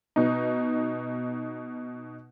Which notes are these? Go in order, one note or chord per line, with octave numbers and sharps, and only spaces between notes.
B2 D#4